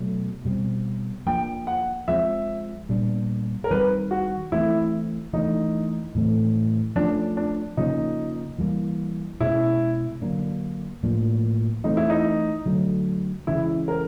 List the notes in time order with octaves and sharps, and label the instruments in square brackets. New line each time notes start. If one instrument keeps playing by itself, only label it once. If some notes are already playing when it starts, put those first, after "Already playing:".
Already playing: [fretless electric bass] B2 F#3 A3
B2 G3 C4
[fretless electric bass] F3 A#3 D4 [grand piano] G5
[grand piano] F#5
[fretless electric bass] F3 G#3 C4 [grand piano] E5
[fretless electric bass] A#2 G3 B3 D4
[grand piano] A#4
[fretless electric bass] D#3 G3 C4 [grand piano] B4
[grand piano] F#4
[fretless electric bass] E3 A3 C4 [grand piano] E4
[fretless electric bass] E3 A3 D4 [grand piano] D#4
[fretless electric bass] A2 E3 A3 C4
[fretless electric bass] F3 A3 C#4 [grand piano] D4
[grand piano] D4
[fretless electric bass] C#3 F3 A#3 C#4 [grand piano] D#4
[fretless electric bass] E3 G3 A#3
[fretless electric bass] B2 G#3 C#4 [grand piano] E4
[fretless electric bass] D3 F#3 A#3 D4
A2 F3 A#3 D4
[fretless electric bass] E3 A3 C4 [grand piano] D#4
[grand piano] E4
D#4
[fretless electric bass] D3 F#3 A3
[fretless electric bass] C#3 E3 G#3 [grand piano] E4
[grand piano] A#4